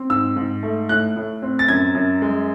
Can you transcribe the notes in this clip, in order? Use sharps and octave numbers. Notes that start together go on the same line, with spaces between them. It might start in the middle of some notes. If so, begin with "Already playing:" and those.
Already playing: C4
G#2 E6
G#2
A3
A2 F#6
A2
C4
A6
F#2 G#6
F#2
G#3